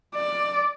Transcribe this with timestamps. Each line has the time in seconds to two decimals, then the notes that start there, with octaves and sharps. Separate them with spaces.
0.15 D5